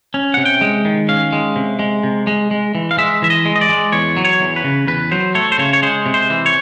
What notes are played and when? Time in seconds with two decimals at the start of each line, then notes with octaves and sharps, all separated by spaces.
0.14 C#4
0.34 C3 F#5
0.45 G5
0.61 G#3
0.85 D#3
1.08 C#4 F5
1.33 G#3
1.56 C3
1.79 G#3
2.03 C3
2.27 G#3
2.51 G#3
2.75 E3
2.91 F5
2.98 G#3 E5
3.22 E3 E5
3.30 D#5
3.45 G#3
3.56 D#5
3.61 D5
3.69 G#3
3.92 E2 C#5
4.17 F#3
4.25 C#5
4.41 E2
4.56 B4
4.64 C#3
4.87 E2 B4
5.11 F#3 C5
5.35 A3 C#5
5.52 C5
5.58 C#3 C#5
5.73 C#5
5.82 G#3 C5
6.06 C3
6.14 C5
6.30 E3
6.46 C#5